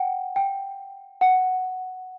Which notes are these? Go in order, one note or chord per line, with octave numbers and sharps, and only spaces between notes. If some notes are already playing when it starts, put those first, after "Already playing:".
Already playing: F#5 G5
G5
F#5